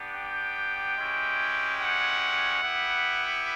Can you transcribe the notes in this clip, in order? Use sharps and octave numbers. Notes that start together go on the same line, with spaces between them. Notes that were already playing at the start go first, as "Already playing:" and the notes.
Already playing: B3 D4 G4
G5
G#3 C#4 E4 G4
F#5
B3 E4 G4